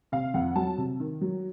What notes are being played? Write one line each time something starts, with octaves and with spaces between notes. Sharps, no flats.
C3 F5
F2 F#5
F#3 A5
C3
D#3
F#3